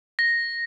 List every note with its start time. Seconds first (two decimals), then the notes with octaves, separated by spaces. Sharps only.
0.19 A#6